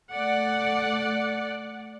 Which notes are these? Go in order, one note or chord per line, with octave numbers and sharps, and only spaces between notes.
A3 D5 F#5